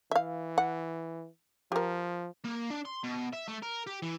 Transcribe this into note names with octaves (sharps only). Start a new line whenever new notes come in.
E3 E5 F5
F#5
F3 G4 A#4
A#3
D4
C6
B2
E5
A3
A#4
G4
E3